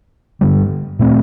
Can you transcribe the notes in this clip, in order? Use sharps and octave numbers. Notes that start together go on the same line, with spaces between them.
G2 D3 G3
A#2 A3 C4